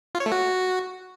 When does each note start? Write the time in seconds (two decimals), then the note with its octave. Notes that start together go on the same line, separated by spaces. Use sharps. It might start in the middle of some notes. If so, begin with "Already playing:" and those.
0.15 F4
0.20 C#5
0.26 A3
0.32 F#4